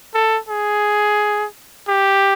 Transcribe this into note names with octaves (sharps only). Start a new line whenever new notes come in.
A4
G#4
G4